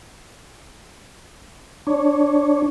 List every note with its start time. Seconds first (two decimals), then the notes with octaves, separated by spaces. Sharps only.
1.87 D4 C#5